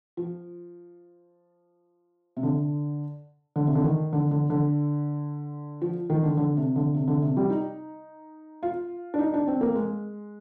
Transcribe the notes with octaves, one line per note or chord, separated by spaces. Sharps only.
F3
C3
D3
D3
C3
D3
D#3
D3
D3
D3
F3
D#3
D3
D3
C3
D3
C3
D3
C3
G3
D#4
F4
D4
D#4
D4
C4
A#3
G#3